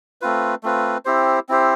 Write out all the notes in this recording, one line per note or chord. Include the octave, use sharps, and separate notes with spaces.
A3 C4 F4 B4
A3 C4 F4 B4
C4 E4 G4 C5
C4 E4 G4 C5